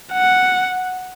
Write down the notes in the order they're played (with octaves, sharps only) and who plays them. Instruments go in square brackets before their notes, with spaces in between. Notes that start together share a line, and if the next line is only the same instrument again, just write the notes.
[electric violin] F#5